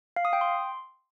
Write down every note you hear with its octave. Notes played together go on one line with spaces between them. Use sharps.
F5
D#6
G5
C6